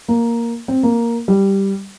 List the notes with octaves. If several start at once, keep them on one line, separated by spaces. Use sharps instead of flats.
A#3
C4
A#3
G3